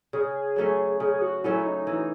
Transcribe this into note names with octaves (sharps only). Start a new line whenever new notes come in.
C#3 G#4
F#3 A3 C#4
C#3 G#4
G#4
F#4
F#3 A3 C#4 E4
D#4
E3